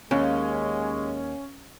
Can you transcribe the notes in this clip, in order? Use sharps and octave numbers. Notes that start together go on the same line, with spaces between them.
D#2 G#3 C#4